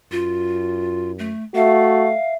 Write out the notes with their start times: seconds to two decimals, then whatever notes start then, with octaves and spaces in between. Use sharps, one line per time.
0.12 F#2 F4
1.19 A3
1.55 A3 F#4 E5 F5